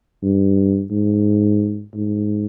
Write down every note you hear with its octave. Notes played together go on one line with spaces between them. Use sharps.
G2
G#2
G#2